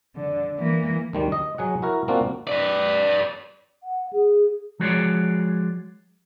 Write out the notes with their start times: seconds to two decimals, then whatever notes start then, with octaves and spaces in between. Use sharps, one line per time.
0.16 D3
0.58 E3 A#3
1.13 D2 D#3 G3
1.32 D#5
1.58 F#3 G#4 F#5
1.82 E4 F#4 A#4
2.08 A#3 C4 D4 F4 F#4
2.47 B4 D5
3.83 F#5
4.13 G#4
4.80 F3 G#3 F#4 G#4 C#5 D5